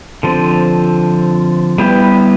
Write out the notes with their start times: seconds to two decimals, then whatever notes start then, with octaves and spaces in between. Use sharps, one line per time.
0.23 D3 F3 C4
1.78 G3 B3 E4 G4 B4